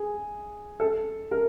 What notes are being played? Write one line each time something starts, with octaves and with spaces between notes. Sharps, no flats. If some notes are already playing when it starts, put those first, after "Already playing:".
Already playing: G#4
A4
A#4